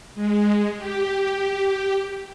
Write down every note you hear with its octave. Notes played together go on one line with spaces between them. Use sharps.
G#3
G4